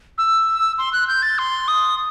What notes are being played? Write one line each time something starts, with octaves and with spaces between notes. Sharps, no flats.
E6
C6
F#6
G6
A6
C6
D#6